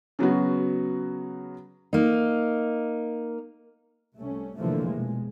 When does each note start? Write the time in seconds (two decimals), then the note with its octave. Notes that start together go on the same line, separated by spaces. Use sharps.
0.19 C#3 F#3 B3 F#4
1.93 A#3 D#4
4.16 C2 A3 C#4
4.57 F1 D3 E3 F3 A3 A#3
4.88 B2 G#3